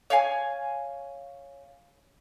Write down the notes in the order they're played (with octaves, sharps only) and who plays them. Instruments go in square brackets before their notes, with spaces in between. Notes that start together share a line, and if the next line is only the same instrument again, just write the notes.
[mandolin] C#5 F5 G#5